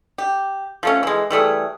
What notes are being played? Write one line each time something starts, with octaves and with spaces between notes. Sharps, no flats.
G4
F3 A3 C#4
E3 G#3
E3 G3 A3 G#4